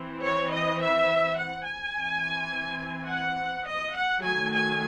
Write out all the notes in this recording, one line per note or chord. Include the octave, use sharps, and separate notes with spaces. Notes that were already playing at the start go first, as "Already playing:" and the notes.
Already playing: E3 C4
C#5
D#5
E5
F#5
G#5
E3 C4
F#5
D#5
F#5
D#3 F#3 A3 G#5
G#5